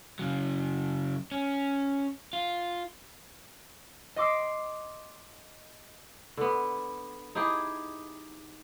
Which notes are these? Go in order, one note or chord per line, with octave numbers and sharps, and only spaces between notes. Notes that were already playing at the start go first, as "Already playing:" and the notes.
C#3 F#3
C#4
F4
D#5 C6 D6 E6 C7
D3 B3
D#4 E4 G4 G#4